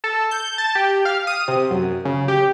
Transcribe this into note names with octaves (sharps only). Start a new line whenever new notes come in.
A4
G6
A5
G4
F5
D#6
C3
F#2
C#3
G4